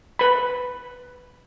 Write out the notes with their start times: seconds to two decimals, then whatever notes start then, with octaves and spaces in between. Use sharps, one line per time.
0.19 B4 B5